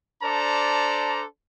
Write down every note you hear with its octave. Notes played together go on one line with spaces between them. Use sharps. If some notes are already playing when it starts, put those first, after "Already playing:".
D4 A4 C5 D5 A5 A#5